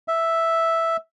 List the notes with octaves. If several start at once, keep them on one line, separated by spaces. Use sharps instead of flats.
E5